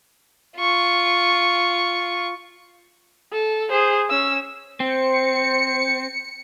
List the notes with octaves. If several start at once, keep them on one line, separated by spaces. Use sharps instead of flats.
F4 C#6
A4
G#4 C5
C#4 E6
C4 C5 C#7